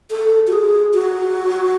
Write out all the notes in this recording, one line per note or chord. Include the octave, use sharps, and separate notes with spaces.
A4
F#4
G#4
F#4